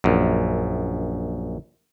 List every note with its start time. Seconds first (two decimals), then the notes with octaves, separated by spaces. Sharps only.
0.04 A#1 F#2